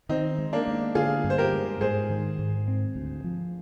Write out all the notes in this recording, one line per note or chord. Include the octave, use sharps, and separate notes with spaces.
D#3 C4 D#4
G#3
A#3 D4
G#3
D3 F4 G#4
G2
C5
G4 A#4
G#3
G#2 G#4 C5
D#3
G#2
C4
D2
F3